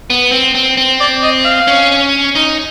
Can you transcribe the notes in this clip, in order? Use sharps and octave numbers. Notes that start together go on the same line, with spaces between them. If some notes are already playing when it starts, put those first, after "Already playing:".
B3
C4
C4
C4
D5
D#5
F5
C#4
D#4